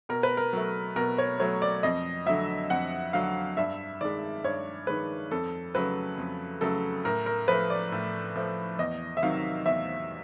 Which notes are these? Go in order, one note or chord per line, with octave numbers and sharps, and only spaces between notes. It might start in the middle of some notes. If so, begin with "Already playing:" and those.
B2 A#4
B4
A#4
F#3 A3
B2 A#4
C#5
F#3 A3 C#5
D5
F2 D#5
D3 F#3 E5
F2 F#5
D3 F#3 F5
G2 E5
D#3 G#3 D5
G2 C#5
D#3 G#3 B4
F2 A4
C#3 F#3 A3 B4
F2
C#3 F#3 A3 A4
A2 A#4
A#4
F3 A3 B4
D5
A2
F3 A3
E2 D#5
E5
C3 D#3 F#3 F5
E2 E5